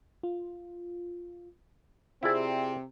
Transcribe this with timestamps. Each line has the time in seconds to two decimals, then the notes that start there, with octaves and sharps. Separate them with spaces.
0.23 F4
2.23 C3 C4 E4 F4 G#4 D5